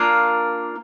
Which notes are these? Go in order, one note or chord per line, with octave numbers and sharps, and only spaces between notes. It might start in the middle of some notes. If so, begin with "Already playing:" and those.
Already playing: A#3 D4 F4 A#4